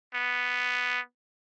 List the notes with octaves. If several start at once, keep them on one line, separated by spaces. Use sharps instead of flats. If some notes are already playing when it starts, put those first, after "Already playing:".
B3